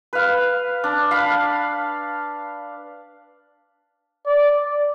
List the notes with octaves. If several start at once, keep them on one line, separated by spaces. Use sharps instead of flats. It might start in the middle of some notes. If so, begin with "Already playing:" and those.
B4 F5
D4
F5 B5
D5